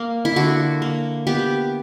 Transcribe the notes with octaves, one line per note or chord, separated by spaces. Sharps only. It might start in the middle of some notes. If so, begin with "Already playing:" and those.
Already playing: A#3
E4
D3 F#4
A#3
B3 G4